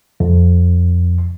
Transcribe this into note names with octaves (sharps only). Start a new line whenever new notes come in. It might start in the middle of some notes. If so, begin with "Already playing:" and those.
F2